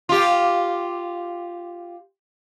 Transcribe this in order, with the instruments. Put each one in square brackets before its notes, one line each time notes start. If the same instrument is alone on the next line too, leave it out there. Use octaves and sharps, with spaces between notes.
[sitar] F4 G4